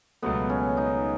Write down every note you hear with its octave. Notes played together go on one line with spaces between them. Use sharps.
C#2 B2 F#3 A3 B3
C#4
D#4